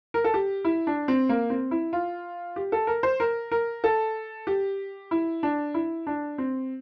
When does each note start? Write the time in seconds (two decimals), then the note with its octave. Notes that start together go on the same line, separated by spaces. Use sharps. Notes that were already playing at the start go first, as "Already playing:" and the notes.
0.14 A#4
0.24 A4
0.34 G4
0.65 E4
0.87 D4
1.08 C4
1.29 A#3
1.50 C4
1.71 E4
1.93 F4
2.56 G4
2.72 A4
2.87 A#4
3.03 C5
3.20 A#4
3.52 A#4
3.84 A4
4.47 G4
5.11 E4
5.43 D4
5.74 E4
6.07 D4
6.38 C4